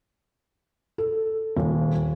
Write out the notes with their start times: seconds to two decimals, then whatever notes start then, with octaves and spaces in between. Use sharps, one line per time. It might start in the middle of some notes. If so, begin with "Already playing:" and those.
0.98 A4
1.57 D#1